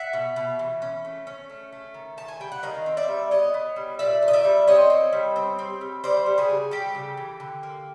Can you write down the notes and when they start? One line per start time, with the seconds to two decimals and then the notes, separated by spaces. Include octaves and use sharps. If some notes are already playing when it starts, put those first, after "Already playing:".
Already playing: E5 F#5
0.13 B2
0.36 B2
0.59 E3
0.82 C#4
1.05 A3
1.27 C#4
1.50 A3
1.72 A3
1.94 D#3
2.17 D#3 A5
2.28 G#5
2.40 G3 G5
2.52 F#5
2.63 D#3 D#5 F5
2.86 C4
2.97 D5 E5
3.08 G3
3.31 B3 C#5 D#5
3.54 B3
3.76 G3
3.99 A#2 D5 E5
4.23 A#2
4.28 D#5
4.33 D5 E5
4.45 G3
4.67 C4 C#5 D#5
4.90 C4
5.13 G3
5.36 C4
5.59 C4
5.81 G3
6.04 G3 C5 D5
6.26 G3
6.38 F#4 G#4
6.50 C#3
6.71 G3 G4 A4
6.95 C#3
7.17 E3
7.40 D3
7.63 A#3